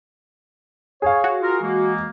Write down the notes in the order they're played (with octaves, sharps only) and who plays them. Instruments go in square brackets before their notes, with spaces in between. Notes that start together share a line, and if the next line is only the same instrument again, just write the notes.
[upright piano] G#4 F5 [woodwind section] C#5
[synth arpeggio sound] F#4
[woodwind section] F4 A#4
E3 G#3 A#3